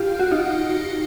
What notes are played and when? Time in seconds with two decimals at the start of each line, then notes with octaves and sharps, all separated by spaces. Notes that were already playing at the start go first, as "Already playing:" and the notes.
Already playing: F4 G4
0.19 F#4
0.31 D#4 F4